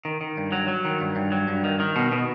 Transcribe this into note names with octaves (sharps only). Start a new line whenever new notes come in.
D#3
D#3
G2
F#3
F#3
D#3
G2
G2
F#3
G2
D#3
D#3
B2
B2